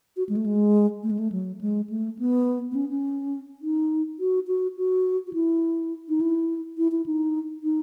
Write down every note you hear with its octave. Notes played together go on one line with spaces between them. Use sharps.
F#4
G#3
A3
G#3
A3
G#3
A3
F#3
G#3
A3
B3
B3
C#4
C#4
D#4
F#4
F#4
F#4
F#4
E4
D#4
E4
E4
E4
D#4
D#4